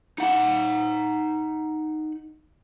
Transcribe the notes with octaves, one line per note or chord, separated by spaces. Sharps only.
D#4 F#5